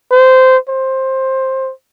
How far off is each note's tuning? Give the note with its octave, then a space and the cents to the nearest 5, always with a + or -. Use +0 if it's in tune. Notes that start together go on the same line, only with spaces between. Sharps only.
C5 -15
C5 +15